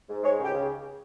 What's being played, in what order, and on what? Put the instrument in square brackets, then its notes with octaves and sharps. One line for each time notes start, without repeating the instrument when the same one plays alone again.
[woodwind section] G#2
G#3 C#5
C#2 G4
C#3